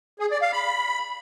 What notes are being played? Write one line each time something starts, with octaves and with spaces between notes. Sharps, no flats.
G#4
D5
F5
B5